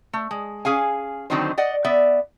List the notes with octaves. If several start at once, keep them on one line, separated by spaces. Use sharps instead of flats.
A3
G#3
C#4 G#4 F5 G#5
D3 D#3 F#3 C4 D#4 C5
D5 D#5 F#5
B3 D5 E5